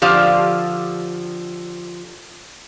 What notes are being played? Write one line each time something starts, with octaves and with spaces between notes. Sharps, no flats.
D3 F3 G4 F5